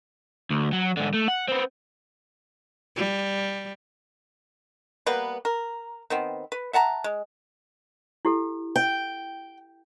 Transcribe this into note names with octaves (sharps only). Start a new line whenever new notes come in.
D2
F#3
G#2 D3
A3
F#5
B3 C4
G3
G3 A#3 B3 B4
A#4
D#3 B3 C4
B4
E5 F#5 A5 A#5
G#3
E4 G4 A4
G5